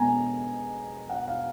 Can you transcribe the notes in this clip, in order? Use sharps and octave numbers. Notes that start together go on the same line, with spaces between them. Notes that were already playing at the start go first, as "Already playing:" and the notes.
Already playing: B2 G#3 B3 G#5 A#5
F#5
F5